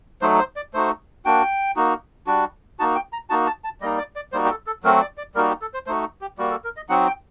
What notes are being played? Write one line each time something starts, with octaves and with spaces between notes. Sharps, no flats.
F#3 A3 D#4 C5
C5
D5
A3 D#4 F#4 C5
A#3 D4 F#4 G5
A#3 D#4 F#4
G3 D4 F#4
A#3 D#4 F#4 A5
G5
A#5
A#3 D#4 F#4 A5
A5
A5
G3 A#3 D#4 D#5
D5
D5
G3 A#3 D#4 F#4 C5
G4
A4
A4
F#3 A3 C4 F#4 A#4
D5
D5
G3 A#3 D#4 F#4 A#4
G4
A4
C5
A3 D#4 F#4 C5
G4
G3 A#3 F#4
A4
A#4
D#5
F#3 C4 D#4 F#4 F#5
G5